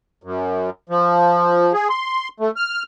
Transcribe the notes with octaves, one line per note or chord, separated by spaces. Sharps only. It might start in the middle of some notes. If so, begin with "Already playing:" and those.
F#2
F3
G#4
C6
A3
F6